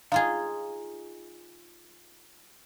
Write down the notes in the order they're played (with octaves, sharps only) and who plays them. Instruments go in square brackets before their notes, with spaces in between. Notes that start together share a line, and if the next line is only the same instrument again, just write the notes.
[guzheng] D#4 F4 G#4 [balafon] F5